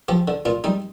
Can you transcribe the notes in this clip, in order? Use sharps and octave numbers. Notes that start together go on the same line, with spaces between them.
F3 G4
D3
A#2 F4
G3 D#4